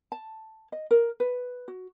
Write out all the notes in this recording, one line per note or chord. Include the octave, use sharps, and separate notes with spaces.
A5
D#5
A#4
B4
F#4